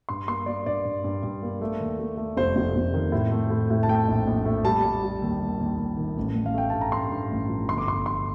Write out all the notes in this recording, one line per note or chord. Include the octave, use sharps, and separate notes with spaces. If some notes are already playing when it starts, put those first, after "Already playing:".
G2 C6
A#3 C6
A#3 D5
G2 D5
G2
G2
G2
A#3
A3
D#2
A3
A3
F1 C5
F1
F1
D#3
A2
A3
A2
A2
A5
A3 G5
A#1
A#1
A3
G3 A5
G3
G3
D#2
D#2
D#2
D#2
D#3
A1
A1
F5
A3 G5
G2 A5
A#5
A1 C6
G2
A1
F3
G1 C6
D6
G1 C6
D3 C6